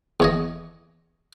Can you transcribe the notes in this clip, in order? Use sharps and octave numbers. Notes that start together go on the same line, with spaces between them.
E2 C#5 D#5